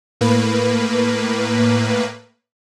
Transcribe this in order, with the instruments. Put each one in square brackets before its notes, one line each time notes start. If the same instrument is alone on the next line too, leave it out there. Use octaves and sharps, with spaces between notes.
[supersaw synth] A2 A#3 B4